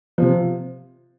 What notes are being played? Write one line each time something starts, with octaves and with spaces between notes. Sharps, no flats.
C3 F3